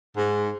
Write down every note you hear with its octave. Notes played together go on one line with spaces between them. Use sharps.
G#2